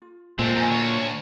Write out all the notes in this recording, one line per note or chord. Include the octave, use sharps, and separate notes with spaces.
F4
A#2 G#3 A3 C4 D5 D#5 A5
F2 G#5 A#5
D2 C#5